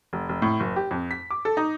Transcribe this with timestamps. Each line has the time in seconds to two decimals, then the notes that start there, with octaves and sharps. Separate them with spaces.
0.13 F1
0.29 F1
0.42 A2
0.60 F#1
0.76 G4
0.91 F2
1.11 B6
1.31 D6
1.45 A4
1.57 D#4